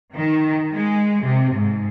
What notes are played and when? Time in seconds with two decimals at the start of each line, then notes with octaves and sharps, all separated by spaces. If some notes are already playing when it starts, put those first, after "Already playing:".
0.16 D#3
0.74 G#3
1.24 C3
1.54 G#2